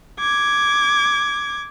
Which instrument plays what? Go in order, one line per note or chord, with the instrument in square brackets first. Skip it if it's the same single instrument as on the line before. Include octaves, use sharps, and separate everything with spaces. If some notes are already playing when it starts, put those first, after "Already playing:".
[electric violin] D6 G#6